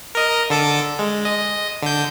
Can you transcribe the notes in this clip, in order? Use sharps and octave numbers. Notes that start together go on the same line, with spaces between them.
A#4 D#5
D3 A4 D6
G#3
D#5
D3 G6